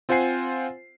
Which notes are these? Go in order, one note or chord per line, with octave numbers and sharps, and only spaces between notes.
C4 F4 C5 F#5 G#5 C7